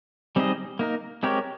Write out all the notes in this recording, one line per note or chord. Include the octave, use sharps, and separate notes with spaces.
G3 C4 D#4 G#4 D#5
A#3 D#4 A#4
G#3 C4 G4 A#4 C#5